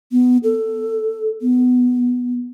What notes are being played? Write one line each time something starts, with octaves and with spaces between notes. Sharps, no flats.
B3
A4
B3